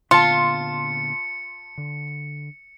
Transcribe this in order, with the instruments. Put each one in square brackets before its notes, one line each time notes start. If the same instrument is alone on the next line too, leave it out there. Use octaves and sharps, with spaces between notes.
[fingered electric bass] A#2 D3 B3 [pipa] F4 [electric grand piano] A5 C6 [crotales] C#7
[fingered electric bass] D3